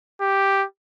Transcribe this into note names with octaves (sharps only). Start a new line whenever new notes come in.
G4